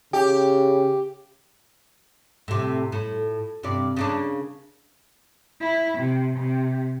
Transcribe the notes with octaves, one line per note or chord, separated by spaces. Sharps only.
C#3 G4
A2 C3
A2
G2 C3 D5
C#3 A#3 D4
E4
C3
C3